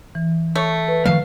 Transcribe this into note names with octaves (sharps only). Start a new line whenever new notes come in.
E3
A3 C#5
B4
D#3 F3 A3 F5